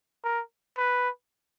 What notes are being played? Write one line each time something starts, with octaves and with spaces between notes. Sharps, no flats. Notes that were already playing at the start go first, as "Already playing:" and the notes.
A#4
B4